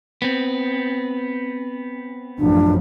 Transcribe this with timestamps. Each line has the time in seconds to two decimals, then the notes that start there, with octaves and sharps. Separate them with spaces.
0.22 B3 C4
2.39 A1 F#2 F3 D4